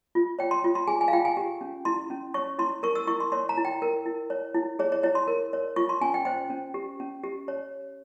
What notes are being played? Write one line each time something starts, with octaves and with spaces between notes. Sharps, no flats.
F4
C#5 G5
C6
F4
C6
G#4 G#5
G#5
F5
F4 G5
G#5
G4
C#4
E4 C6
C#4
C#5 C#6
E4 C6
A#4 C#6
E6
E4 C#6
C6
C#5 C6
A#5
E4
G5
A#4
E4
C#5
E4
G#4 C#5
C#5
E4 C#5
C6
A#4
C#5
F4 C#6
C6
C#4 G#5
G5
C5 G5
C#4
G4
C#4
G4
C#5